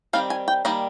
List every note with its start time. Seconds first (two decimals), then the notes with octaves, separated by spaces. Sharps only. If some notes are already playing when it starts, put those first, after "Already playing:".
0.13 D#3 G3 C4 F5
0.30 G#5
0.48 G5
0.65 D#3 G3 A#3 D#5